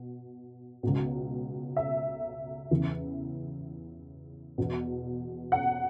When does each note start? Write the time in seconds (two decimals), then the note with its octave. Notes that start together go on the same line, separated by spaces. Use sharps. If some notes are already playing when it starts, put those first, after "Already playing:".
Already playing: B2
0.83 C#2 B2
1.77 E5
2.71 E2 C#3 E3
4.58 E2 B2
5.52 F#5